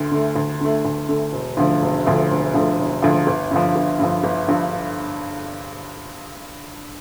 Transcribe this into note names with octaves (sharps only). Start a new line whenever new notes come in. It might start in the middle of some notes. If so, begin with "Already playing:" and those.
Already playing: D2 D3
D3 A3
D2
D3 A3
D2
D3 A3
E1
D2 D3 F3 A3
E1
D2 D3 F3 A3
E1
D2 D3 F3 A3
E1
D2 D3 F3 A3
G1
G2 D3 F3
G1
G2 D3 F3
G1
G2 D3 F3